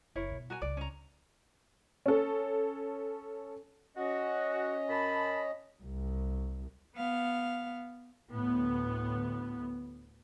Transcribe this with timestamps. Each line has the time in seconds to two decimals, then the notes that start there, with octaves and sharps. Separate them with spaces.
0.15 F#1 E4 A#4 C#5
0.32 B2
0.50 F#4 A#4 G#5
0.62 C#2 D5
0.77 C#4 A#5
2.06 C#4 A4
3.97 C#4 F#4 D#5
4.89 F#2 A5 B5
5.83 C2
6.95 B3 F5
8.33 D2 A2 B3